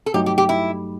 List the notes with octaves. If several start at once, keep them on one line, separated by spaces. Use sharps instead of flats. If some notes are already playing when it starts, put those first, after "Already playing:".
A4
G2 F#3 A3 D#4 G4
G4
G4
E4